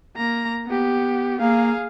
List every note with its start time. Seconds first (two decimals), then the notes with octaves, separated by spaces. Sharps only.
0.16 A#3 A#5
0.66 B3 G4
1.41 A#3 G#4 F5